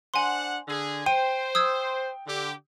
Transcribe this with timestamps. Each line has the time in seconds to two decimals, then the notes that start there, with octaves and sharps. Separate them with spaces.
0.14 D4 C5 F#5 G#5 C6
0.68 D3 G#4
1.06 C5 G5 D#7
1.55 D#6 E6 G#6
2.26 D3 G4